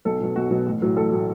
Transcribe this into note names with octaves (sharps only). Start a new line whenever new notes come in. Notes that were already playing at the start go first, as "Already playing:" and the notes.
B1 A4
B2 F#3
B1 F#4
B2 F#3
A1
A2 F#3
A1 A4
A2 F#3